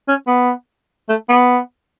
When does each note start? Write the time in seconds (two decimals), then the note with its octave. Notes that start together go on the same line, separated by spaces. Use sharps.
0.08 C#4
0.27 B3
1.09 A3
1.29 B3